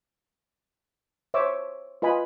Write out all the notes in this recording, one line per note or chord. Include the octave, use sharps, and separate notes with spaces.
C5 C#5 E5 D6 E6
F4 B4 D#5 G#5 B5